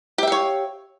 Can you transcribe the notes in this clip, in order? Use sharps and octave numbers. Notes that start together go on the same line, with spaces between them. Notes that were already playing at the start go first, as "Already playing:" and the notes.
G4 C#5 E5 F5